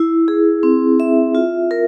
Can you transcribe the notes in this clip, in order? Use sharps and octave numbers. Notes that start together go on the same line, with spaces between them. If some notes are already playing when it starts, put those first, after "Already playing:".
Already playing: E4
G#4
C4
E5
F4
A#4